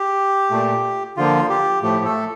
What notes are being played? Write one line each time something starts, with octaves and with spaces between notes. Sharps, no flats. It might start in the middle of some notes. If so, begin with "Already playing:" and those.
Already playing: G4
A#2 A3
D3 F3 A#3 F4
G4
A2 F3 A3 G4
A3 A4